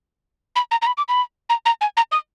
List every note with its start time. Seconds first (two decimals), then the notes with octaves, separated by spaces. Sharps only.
0.56 B5
0.71 A#5
0.82 A#5
0.87 B5
0.97 D6
1.09 B5
1.49 A#5
1.66 A#5
1.81 G#5
1.97 A#5
2.12 D#6